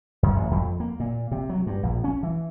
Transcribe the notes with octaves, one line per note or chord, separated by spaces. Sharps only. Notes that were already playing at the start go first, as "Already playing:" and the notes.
F#2
A1
F2
A#3
A#2
C3
F#3
G2
A#1
C#4
E3